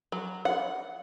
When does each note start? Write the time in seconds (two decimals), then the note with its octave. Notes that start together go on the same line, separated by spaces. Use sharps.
0.12 F#3
0.45 F#5